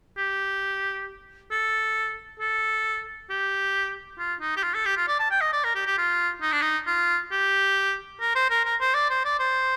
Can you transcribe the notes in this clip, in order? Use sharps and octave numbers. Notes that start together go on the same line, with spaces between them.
G4
A4
A4
G4
F4
D#4
G4
F4
A4
G4
F4
D5
A5
G5
D#5
D5
A#4
G4
G4
F4
D#4
D4
D#4
F4
G4
A#4
C5
A#4
A#4
C5
D5
C5
D5
C5